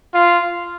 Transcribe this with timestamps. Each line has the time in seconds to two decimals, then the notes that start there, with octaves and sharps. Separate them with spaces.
0.14 F4